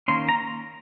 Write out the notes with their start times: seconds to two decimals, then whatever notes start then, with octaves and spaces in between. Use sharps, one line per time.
0.08 D#3 A#3 C#4 C6
0.29 A#5